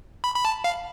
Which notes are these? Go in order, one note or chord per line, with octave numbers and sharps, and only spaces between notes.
B5
B5
A5
F5